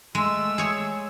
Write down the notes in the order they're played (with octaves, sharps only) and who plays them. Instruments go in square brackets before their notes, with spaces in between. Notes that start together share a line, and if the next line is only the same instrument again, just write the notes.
[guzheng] G#3 [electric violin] A3 E6
[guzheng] G#4 C#5 G#5